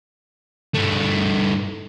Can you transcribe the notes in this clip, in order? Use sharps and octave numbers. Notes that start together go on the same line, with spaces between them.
G2 A3